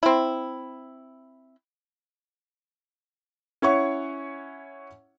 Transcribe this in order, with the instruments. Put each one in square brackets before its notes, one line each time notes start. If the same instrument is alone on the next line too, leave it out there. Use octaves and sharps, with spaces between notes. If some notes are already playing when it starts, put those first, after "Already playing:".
[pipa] C4 E4
[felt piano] C#4 E4 C#5 E5 F#5 C#6